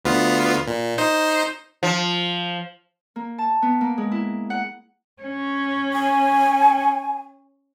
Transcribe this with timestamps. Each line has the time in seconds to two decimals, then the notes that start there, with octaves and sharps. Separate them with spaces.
0.05 D2 B3 F4
0.68 A#2
0.98 D#4 C5
1.83 F3
3.16 A#3
3.38 A5
3.62 B3
3.81 A#3
3.98 G#3
4.11 E4
4.50 F#5
5.23 C#4
5.93 G#5